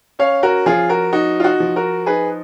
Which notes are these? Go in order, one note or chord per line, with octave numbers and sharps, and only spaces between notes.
C#4 C#5 F5
F#4 A#4
F3 F4 G#4
F#4 A#4
D#4 F#4
F4
D#4 F#4
F3
F#4 A#4
D#4 G#4 B4